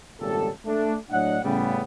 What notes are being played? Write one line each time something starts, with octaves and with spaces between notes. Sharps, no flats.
G#1 C#2 A#2 G3 G4 A4
A3 D4
A2 F#3 D4 D5 D#5 F#5
A2 C#3 G3 B3